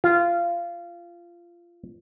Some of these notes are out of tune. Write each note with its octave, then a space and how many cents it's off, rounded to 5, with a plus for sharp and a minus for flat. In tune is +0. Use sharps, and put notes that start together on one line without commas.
F4 -20